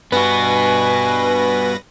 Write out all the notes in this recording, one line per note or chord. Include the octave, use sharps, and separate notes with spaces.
G2 B3 F#4 B4 G#5 A#6